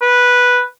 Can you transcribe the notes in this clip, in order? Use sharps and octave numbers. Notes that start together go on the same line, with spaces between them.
B4